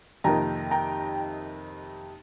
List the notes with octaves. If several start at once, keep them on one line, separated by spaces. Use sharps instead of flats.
F2 C3 D#3 A#3 D#4 G5 A#5
G5 A#5